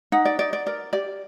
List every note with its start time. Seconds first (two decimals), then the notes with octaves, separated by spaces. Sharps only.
0.12 D#4 F#5
0.25 D5
0.39 D#4 D5
0.53 D5
0.66 A#4 D5
0.93 G4 D5